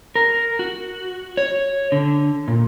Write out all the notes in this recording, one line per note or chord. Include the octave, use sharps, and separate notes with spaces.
A#4
F#4
C#5
D3
A#2